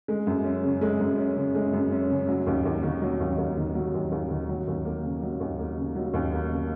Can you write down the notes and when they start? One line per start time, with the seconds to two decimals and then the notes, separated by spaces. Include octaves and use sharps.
0.08 G#3
0.27 F#2
0.44 C#4
0.63 C#3
0.81 G#3
1.00 F#2
1.18 C#4
1.37 C#3
1.55 G#3
1.73 F#2
1.92 C#4
2.11 C#3
2.28 F#3
2.47 D#2
2.65 D#2
2.83 D#3
3.02 F#3
3.20 D#2
3.38 D#2
3.57 D#3
3.75 F#3
3.94 D#2
4.12 D#2
4.30 D#3
4.49 F#3
4.67 D#2
4.85 A#3
5.03 C#3
5.22 F#3
5.40 D#2
5.59 A#3
5.77 C#3
5.95 F#3
6.14 D#2
6.32 A#3
6.51 C#3